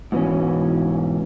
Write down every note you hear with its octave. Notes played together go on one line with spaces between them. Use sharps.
G#2 B2 E3 C#4